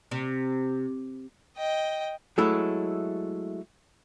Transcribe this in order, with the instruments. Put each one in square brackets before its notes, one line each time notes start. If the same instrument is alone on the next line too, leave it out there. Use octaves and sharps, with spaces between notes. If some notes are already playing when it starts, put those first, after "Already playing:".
[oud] C3
[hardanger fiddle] D#5 G5
[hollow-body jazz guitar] F#3 G#3 A3 E4